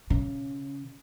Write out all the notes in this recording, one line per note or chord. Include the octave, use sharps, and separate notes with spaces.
C#3